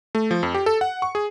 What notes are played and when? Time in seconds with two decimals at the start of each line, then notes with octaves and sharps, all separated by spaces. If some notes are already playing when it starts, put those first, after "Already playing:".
0.15 A3
0.31 F3
0.43 F2
0.55 G4
0.66 A4
0.81 F#5
1.02 C#6
1.15 G#4